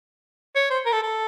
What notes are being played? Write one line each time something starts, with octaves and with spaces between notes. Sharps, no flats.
C#5
C5
A#4
A4
A4